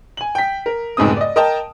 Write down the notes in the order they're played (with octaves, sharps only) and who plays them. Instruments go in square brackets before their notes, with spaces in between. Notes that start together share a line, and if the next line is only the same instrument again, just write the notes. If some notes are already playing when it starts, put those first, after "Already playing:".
[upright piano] G#5 F#7
G5 B6
A#4
F1 B1 G#2 C#3 C4 D#6
D5 D#5
A#4 D#5 G5 A5